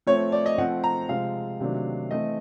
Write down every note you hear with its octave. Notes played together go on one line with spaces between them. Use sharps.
F3 A3 C4 C#5
D5
D#5
F3 A3 C4 F#5
A#5
C3 F3 G#3 C4 F5
C3 D#3 F#3 A3 D4
E3 A3 C4 D#5